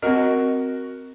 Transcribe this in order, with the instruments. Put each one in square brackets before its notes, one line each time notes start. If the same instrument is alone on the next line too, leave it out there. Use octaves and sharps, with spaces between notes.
[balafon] C4 D#5 [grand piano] F#4 A#4